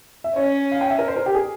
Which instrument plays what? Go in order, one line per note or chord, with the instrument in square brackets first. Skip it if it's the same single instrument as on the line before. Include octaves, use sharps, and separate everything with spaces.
[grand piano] E5
[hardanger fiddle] C#4 [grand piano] C#5
[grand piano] F5
G5
E5
A#4
C5
A#4
G4
G#4